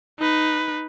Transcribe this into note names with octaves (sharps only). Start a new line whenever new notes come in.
D#4 B4